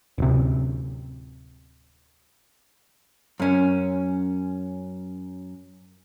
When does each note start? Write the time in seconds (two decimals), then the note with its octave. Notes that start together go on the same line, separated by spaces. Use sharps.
0.18 D1 C3
3.40 F#2 C#4